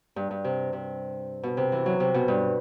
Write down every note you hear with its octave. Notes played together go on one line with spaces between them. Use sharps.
G2
G2
C3
C3
B2
C3
E3
F#3
C3
B2
G2